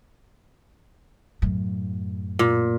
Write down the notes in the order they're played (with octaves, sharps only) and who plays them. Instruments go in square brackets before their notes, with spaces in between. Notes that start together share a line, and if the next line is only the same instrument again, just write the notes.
[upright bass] F#2 A2
[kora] A#2